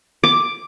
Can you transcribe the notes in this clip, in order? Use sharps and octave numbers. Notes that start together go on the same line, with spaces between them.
D6